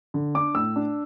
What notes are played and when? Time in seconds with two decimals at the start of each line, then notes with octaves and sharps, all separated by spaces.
0.14 D3
0.35 D4 D6
0.55 A2 E6
0.76 D4